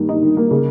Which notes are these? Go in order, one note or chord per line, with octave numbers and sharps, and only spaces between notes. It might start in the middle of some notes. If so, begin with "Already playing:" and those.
Already playing: G2 D#3 A#3
D#4
D#3
A#3
C#3